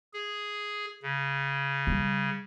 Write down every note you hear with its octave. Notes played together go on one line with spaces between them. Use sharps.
G#4
C#3
G3